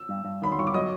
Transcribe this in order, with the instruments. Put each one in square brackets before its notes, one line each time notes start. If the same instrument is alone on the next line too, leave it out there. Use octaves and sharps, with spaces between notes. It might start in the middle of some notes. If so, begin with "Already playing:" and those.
Already playing: [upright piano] E6
[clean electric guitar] G2
G2
[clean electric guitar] D#3 [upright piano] B5
[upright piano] C6
[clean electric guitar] G2 [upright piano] C#6
[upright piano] D6
[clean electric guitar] F#3 [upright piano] D#5 D#6